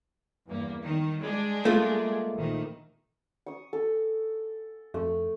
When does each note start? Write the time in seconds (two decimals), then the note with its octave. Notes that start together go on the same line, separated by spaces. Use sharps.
0.47 E2 G2 A#3
0.83 D#3
1.21 G3 G#3 D4
1.65 A3 A#3 F4
2.33 A#1 D#3
3.46 C#6 D#6
3.73 A4
4.94 F2 A3